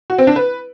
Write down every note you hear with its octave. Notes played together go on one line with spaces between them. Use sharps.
F#4
C4
D4
B4